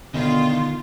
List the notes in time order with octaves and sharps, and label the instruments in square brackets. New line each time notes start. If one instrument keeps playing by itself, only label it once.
[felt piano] B2 [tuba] D3 [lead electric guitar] D#3 [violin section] F4